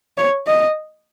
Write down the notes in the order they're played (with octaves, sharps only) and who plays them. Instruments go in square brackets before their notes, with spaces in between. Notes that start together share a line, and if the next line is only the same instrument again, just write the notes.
[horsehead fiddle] C#5
D#5